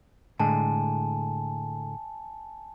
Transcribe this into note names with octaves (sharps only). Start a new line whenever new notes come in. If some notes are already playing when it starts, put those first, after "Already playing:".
A2 D3 G#3 G#5 A5